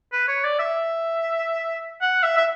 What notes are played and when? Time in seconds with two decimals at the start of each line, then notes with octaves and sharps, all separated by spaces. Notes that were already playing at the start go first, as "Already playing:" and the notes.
0.12 B4
0.28 C#5
0.44 D5
0.59 E5
2.01 F#5
2.23 E5
2.37 E5